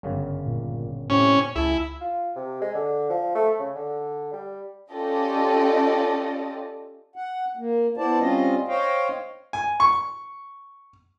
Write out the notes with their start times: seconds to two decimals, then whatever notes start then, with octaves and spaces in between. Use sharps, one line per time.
0.03 G1 F#2 C#3
0.46 A#2
1.10 A2 C3 C#4 G4 D5
1.55 C#2 E4 G#4 A5
2.01 F4
2.36 C3
2.61 G#3
2.75 D3
3.10 F3
3.35 A3
3.59 C#3
3.76 D3
4.33 G3
4.92 C#4 F4 G4 A4 D5 D#5
7.16 F#5
7.57 A#3
7.97 B3 E4 C5 D5 A5
8.19 G3 C4 C#4 F4 D#5
8.68 C5 C#5 D#5 F5 G5
9.53 G#5
9.80 C#6